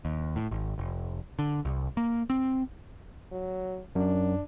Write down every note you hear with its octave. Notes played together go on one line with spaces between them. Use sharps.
D#2
A2
G#1
F1
D3
C2
A#3
C4
F#3
F#2 D4